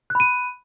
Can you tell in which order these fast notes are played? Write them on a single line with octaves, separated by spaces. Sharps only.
F#6 B5 D#7